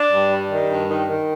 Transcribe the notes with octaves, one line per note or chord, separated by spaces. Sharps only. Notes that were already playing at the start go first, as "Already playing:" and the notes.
Already playing: D4
G2
G3
D#3
G2
D#3
D#3